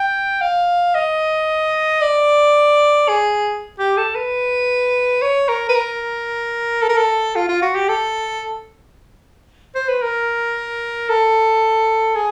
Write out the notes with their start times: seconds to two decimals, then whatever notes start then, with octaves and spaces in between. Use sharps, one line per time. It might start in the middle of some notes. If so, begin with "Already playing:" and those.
Already playing: G5
0.41 F5
0.95 D#5
2.01 D5
3.08 G#4
3.79 G4
3.97 A4
4.15 B4
5.22 C#5
5.48 A#4
5.69 B4
5.75 A#4
6.82 A4
6.89 A#4
6.98 A4
7.35 F4
7.49 F4
7.62 F#4
7.75 G4
7.88 A4
9.75 C5
9.88 B4
10.02 A#4
11.09 A4
12.15 G#4